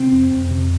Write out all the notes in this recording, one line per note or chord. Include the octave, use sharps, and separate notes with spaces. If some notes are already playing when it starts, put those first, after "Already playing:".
Already playing: C3 C4
F2
F2
C3